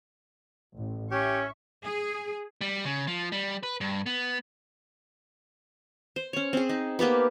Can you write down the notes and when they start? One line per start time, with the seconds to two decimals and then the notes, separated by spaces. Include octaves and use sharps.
0.76 A1
1.11 C#4 G4 E5 C#6
1.84 G#4
2.61 G3
2.85 C#3
3.07 F3
3.32 G3
3.63 B4
3.81 G2
4.06 B3
6.16 C5
6.33 C#4 C#5
6.53 C4 G#4
6.69 D#4
6.99 A#3 B3 G4 B4